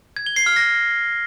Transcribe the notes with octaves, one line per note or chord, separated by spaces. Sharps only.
G#6
G7
C7
F6
A#6